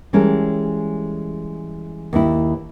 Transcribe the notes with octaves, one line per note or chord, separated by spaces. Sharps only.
E3 G3 G#3 C#4 A4 A#4
D#2 E4